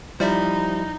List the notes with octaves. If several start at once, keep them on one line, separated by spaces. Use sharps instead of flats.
F3 G3 D#4 E4 C5 D5 E5